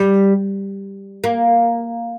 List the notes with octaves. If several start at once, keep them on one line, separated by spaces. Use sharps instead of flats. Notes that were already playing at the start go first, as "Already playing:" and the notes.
Already playing: G3
A#3